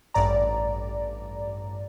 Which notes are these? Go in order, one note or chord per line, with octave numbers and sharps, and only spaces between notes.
A1 G2 D5 A#5